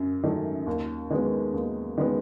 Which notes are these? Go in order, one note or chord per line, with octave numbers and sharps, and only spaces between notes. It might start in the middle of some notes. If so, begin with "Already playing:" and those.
Already playing: F#2 F#3
D#3 F#3 A3
D#2
D#3 G#3 B3
D#2
D#3 G#3 B3